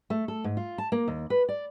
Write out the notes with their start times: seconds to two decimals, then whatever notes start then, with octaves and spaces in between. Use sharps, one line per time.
0.10 A3
0.28 A4
0.44 G#2
0.57 F4
0.78 A5
0.92 A#3
1.08 D#2
1.30 B4
1.49 D5